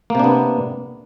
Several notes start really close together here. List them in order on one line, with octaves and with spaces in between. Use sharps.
A#3 C3 D4 B3